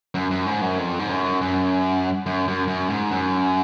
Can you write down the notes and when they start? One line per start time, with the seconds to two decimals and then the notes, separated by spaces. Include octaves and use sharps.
0.15 F#2
0.31 F#2
0.46 G#2
0.62 F#2
0.79 F2
0.99 G#2
1.09 F#2
1.42 F#2
2.26 F#2
2.48 F#2
2.68 F#2
2.90 G#2
3.11 F#2